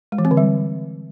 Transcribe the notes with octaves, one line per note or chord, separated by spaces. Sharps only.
G#3
E3
C4
D3
G3